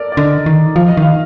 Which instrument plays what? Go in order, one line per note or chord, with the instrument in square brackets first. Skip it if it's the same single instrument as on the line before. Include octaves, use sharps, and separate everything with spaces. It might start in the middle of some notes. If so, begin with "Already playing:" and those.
Already playing: [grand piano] A4 A#4 D5
D5
[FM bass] D3 [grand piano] D#5
[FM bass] D#3
[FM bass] F3 [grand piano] F5
[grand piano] D#5
[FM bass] D#3 [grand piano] F5